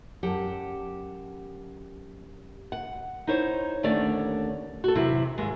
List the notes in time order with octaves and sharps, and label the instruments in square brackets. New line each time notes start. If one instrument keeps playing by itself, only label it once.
[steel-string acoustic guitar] F#2 G4 F#5 A5
[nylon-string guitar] F#5
D#4 E4 C5 C#5
D#2 D3 A3 C#4 D5
F#4 A4
E2 C3 F#3 E4
D#2 G#2 G#3